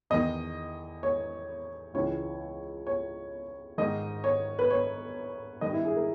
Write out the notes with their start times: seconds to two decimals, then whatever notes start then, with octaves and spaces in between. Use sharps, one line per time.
0.10 E2 D#3 D#5
1.03 C#5
1.94 C#2 C#3 E3 C#5
2.87 C#5
3.78 G#2 D#3 D#5
4.24 C#5
4.59 B4
4.70 C#5
5.61 G2 D#3 D#5
5.73 E4
5.85 G#4
5.96 A#4